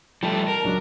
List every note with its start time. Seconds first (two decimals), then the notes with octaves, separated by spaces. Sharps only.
0.23 F3 G3 A3 A5
0.48 A#4
0.64 C#2 F#3 D4